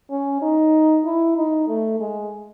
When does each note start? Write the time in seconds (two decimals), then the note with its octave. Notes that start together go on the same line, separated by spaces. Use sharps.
0.10 C#4
0.42 D#4
1.05 E4
1.36 D#4
1.68 A3
2.00 G#3